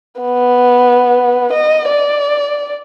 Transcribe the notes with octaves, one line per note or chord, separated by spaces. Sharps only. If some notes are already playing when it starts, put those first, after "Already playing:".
B3
D#5
D5